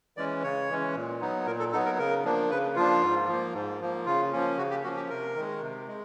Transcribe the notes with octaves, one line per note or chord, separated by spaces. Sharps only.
E3 G#3 C#4 D5
C#3 C#5
E3 G#3 C#4
A#2
F#3 B3 D#4
A#2 A#4
A4
F#3 B3 D#4 A4
A#4
C#3 A#4
F3 A#3 D4
C#3 B4
F3 A#3 D4 F4
G#2
F3 A#3
G#2
F3 A#3
C#3 F4
F3 A#3 C#4
C#3 F#4
G4
F3 A#3 C#4 F#4
G4
C3 A#4
D#3 G#3
C3
G#3